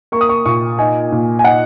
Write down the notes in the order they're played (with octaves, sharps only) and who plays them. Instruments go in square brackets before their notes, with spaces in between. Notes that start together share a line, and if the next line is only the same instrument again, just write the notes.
[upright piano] A#3 C#6
D#6
C#6
A#2 C#6
D#4 G#5
A#2
G#5
D#4 F#5